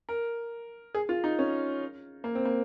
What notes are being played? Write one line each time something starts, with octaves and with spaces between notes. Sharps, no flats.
A#4
G#4
F4
D#4
C#4
A#3
C4
A#3